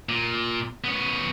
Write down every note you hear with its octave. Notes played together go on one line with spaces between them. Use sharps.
A#2
B3 C#4